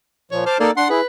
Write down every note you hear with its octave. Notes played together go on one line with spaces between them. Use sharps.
A#2 F3 C#5
C5 A5 D6 F6
A#3 D#4 A4 D5
D4 F#5 C6
E4 G#4 B4